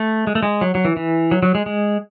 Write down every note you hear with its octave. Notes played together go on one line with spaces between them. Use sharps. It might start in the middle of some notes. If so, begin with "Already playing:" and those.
Already playing: A3
G#3
A3
G#3
F#3
F#3
E3
E3
F#3
F#3
G#3
G#3